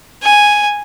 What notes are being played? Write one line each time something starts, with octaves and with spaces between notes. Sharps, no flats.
G#5